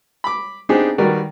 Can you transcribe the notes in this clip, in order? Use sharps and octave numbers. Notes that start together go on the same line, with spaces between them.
B5 D6
B3 C4 D4 D#4 G4 G#4
D#3 G3 F#4 A#4 B4 D5